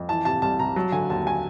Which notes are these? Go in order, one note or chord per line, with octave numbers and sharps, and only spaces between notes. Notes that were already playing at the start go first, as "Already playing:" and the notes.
Already playing: F2
E3 A5
C3 A5
C2 A5
C2 A#5
F#3 A5
D3 G#5
D#2 A5
G#5